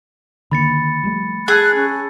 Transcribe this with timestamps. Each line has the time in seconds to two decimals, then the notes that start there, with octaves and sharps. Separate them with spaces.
0.51 D3 D#3 A#3 B5 A6 C#7
1.03 F3 G3 A3
1.48 G#4 A5 E6 F#6 A6
1.75 C#4